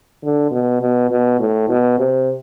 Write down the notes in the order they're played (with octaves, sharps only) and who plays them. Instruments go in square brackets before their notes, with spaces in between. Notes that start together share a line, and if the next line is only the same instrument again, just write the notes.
[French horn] D3
B2
B2
B2
A2
B2
C3